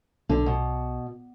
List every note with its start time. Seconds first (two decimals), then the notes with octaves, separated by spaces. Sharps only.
0.29 B1 D3
0.46 B2